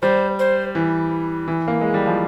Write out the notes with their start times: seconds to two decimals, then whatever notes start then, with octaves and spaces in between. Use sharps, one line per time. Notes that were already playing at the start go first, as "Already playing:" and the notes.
0.02 G3 C5
0.39 C5
0.75 E3
1.48 E3
1.68 A#3
1.81 G#3
1.94 G3
2.07 F3